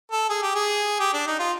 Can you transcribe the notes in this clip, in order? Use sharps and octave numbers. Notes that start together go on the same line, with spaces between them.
A4
G#4
G4
G#4
G4
D4
D#4
F4